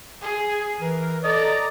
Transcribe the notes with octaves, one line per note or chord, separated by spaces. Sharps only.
G#4
E3 A#4
A4 D5 D#5 A#5